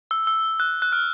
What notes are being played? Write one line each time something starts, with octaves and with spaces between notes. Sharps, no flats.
E6
E6
F#6
F#6
F6